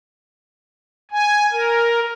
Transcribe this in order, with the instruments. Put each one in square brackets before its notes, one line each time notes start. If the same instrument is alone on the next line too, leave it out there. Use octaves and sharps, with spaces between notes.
[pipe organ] G#5
A#4